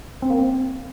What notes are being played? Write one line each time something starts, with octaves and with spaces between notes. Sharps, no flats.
C4
A#3
C4